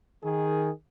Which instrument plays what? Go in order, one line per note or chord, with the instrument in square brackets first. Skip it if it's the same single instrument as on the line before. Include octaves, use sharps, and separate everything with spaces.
[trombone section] D#3 G#4